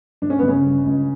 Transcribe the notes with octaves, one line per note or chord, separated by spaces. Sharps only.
G1 D4
C#4
G1 B3
C#3 C#4
G2
C#2